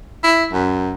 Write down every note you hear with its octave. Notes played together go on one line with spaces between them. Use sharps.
E4
F#2